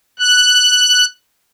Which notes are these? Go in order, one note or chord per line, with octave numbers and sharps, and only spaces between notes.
F#6